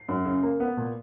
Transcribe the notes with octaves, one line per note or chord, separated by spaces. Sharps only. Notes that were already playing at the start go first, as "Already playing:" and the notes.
Already playing: C7
F#2
C#3
A#3
B3
A#2